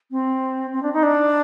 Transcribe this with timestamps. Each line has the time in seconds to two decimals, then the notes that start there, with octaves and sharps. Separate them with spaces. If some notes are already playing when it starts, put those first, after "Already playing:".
0.11 C4
0.73 C4
0.83 D4
0.93 D#4
1.03 D4